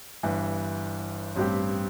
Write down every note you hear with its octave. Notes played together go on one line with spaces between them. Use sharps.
G1 G2 E3
A1 G2 G3 C4 G4